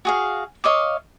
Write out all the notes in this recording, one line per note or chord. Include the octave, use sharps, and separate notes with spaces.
F#4 G#4 F5
C#5 D#5 F5 D6